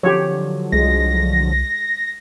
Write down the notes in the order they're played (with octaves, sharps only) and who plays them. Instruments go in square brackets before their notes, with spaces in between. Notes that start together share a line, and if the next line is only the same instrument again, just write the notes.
[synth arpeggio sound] D3 F3 F#3 [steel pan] G4 C#5
[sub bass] C2 [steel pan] G#3 [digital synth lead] A#6